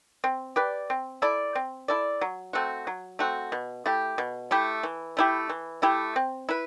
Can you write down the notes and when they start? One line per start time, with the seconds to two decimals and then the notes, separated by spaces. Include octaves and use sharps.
0.24 C4
0.56 G4 B4 D5
0.90 C4
1.22 E4 A4 D5
1.55 C4
1.88 E4 A4 D5
2.21 F#3
2.53 A3 C4 F#4
2.87 F#3
3.19 A3 C4 F#4
3.52 B2
3.86 A3 E4 G4
4.18 B2
4.51 A3 E4 G4
4.83 E3
5.17 A3 E4 G4
5.49 E3
5.82 A3 E4 G4
6.16 C4
6.49 E4 B4